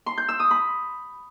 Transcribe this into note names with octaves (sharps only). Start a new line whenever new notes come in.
C6
G6
E6
D#6
B5